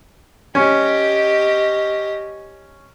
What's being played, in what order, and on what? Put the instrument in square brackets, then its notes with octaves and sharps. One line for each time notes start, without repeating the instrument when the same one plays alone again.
[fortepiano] C#4 [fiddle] G4 D#5